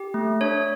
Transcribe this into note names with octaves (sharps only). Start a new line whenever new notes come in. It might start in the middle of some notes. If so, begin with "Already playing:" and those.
Already playing: G4
A3
D4 C#5